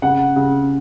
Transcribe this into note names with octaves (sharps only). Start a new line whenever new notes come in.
C#3 F#5
C#3